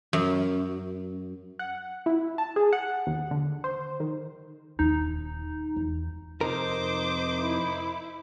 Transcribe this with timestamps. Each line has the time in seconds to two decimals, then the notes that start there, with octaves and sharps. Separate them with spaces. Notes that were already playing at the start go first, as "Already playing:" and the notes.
0.13 F#2
1.59 F#5
2.06 E4
2.38 A5
2.56 G#4
2.73 F#5
3.07 D#2
3.31 D3
3.64 C5
4.00 D#3
4.79 D#1 D#2 D#4
5.76 E2
6.41 F2 C3 D#4 A#4 C5 D6
7.39 E4